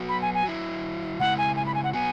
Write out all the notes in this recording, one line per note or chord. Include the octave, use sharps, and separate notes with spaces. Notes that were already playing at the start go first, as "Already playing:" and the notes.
Already playing: F#3 B3 F#4
B5
G#5
G#5
F#3 E4
C#3 G#3 E4 F#5
G#5
G#5
B5
G#5
F#5
F#3 B3 F#4 G#5